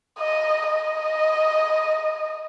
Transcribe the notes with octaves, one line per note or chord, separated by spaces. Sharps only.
D#5
D#5